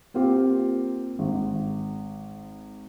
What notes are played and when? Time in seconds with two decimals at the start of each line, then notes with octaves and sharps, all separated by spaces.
0.14 A#3 C4 F4 G4
1.19 G#1